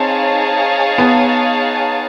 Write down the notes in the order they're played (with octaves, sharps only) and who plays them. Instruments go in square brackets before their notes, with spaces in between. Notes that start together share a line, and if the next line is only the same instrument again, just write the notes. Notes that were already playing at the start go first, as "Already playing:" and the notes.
Already playing: [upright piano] C4 [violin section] D#4 G#4 C#5 F5 A5
[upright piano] B3